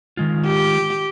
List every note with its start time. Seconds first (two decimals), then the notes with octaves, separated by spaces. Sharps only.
0.17 D#3 G#3 F4
0.47 G4